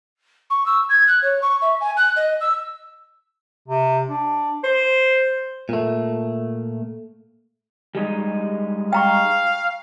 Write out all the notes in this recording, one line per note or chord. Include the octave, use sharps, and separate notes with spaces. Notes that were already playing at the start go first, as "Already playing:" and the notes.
C#6
E6
G#6
F#6
C#5
C#6
E5
G#5
F#6
D#5
E6
C3
D4
C5
A#2 A3
G3 G#3 D#4
F5 G5 A#5 C#6